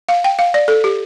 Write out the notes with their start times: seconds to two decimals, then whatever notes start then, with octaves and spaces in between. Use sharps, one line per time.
0.09 F5
0.24 G5
0.39 F5
0.54 D5
0.68 A4
0.84 G4